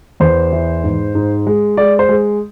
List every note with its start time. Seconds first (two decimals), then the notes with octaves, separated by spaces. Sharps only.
0.20 E2 C5
0.52 E3
0.84 G#2
1.15 G#2
1.47 G#3
1.77 G#3 D5
1.99 C5
2.09 G#3